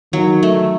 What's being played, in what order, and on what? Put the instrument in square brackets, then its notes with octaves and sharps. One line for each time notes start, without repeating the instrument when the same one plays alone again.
[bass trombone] D#3 [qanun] F#3
[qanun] A3